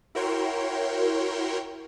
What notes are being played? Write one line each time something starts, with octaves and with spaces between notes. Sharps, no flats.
E4 F#4 A#4 C#5 G5 C6